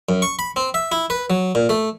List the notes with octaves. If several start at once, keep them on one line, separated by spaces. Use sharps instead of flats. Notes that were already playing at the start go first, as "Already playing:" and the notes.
F#2
C#6
B5
C4
E5
E4
B4
F#3
A#2
A3